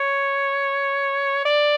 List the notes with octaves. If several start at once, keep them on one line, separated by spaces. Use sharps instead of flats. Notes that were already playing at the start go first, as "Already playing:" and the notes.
Already playing: C#5
D5